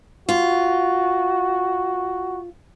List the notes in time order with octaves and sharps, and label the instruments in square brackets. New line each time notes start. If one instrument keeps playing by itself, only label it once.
[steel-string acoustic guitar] F4 [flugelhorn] F#4